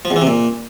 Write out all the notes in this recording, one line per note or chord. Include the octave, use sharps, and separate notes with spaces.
F3
E2
E3
C3
A#2